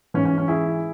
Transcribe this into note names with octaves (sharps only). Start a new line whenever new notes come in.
G#2 E3 C#4
C#4
C#4
E4 G#4